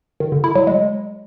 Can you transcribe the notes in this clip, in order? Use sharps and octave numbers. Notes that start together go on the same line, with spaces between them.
D#3
D3
E4
F#3
G#3